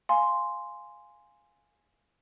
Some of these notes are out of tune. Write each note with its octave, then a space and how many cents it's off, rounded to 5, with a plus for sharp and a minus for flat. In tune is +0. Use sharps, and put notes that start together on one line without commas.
F5 +0 G#5 +0 C6 -5